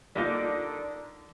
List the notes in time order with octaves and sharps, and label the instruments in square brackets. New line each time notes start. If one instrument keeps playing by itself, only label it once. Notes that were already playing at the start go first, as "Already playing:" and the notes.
[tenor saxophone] D3 [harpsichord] G3 A#3 F4 [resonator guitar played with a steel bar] D4 D#4 A#4